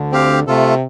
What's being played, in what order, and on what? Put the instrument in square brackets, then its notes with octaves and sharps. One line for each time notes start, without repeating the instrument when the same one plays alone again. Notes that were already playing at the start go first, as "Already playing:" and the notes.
Already playing: [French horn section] D2 D3
[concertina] C4 G4 F5
[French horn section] C3 [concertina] A3 F4 A4